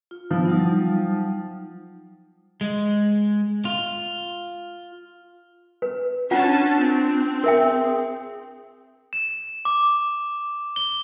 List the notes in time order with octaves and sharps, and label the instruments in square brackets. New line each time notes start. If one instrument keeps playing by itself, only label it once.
[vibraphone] F4
[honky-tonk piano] F3 [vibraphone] B3 E4 F4
[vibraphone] F#3 G3 D#4
[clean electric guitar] G#3
F4
[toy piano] B4
[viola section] C#4 A5 [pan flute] D4 [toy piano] F4 F#5
[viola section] C4
[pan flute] G#4 [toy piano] A#4 E5 G5
[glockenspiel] E7
D6
G7